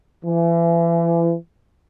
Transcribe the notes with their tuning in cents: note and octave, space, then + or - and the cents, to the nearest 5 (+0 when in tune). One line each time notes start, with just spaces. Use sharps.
E3 +35